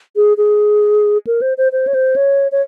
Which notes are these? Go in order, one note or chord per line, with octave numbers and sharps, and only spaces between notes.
G#4
G#4
A#4
C5
C5
C5
C#5
C5
C#5
C#5